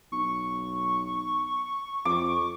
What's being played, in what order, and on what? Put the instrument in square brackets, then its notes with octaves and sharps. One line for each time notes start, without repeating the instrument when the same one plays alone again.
[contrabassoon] B1 [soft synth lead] C#6
[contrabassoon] F2 [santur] D6